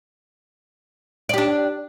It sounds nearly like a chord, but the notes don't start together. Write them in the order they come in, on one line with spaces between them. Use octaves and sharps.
D5 G4 D4